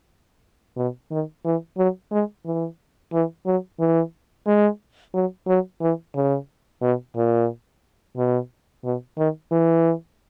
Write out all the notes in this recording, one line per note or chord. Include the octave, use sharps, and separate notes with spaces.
B2
D#3
E3
F#3
G#3
E3
E3
F#3
E3
G#3
F#3
F#3
E3
C#3
B2
A#2
B2
B2
D#3
E3